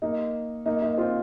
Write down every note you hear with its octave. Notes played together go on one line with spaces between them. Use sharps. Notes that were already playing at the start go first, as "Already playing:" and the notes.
A#3 D#4
A#3 D#4
A#3 D#4
C4 F4